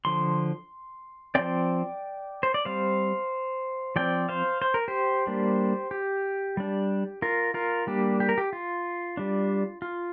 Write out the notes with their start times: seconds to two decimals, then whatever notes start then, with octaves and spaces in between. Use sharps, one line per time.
0.05 D3 F3 C6
1.35 F3 C4 D5 G5
2.43 C5
2.54 D5
2.65 G3 C4 C5 F5
3.96 F3 C4 D5 G5
4.29 C5 F5
4.62 C5
4.74 A#4
4.88 G4 C5
5.27 G3 A#3 D4
5.91 G4
6.57 G3 D4
7.22 F4 A#4
7.54 F4 A#4
7.87 G3 A#3 D4 G4
8.20 G4
8.29 A#4
8.38 G4
8.53 F4
9.17 G3 D4
9.82 F4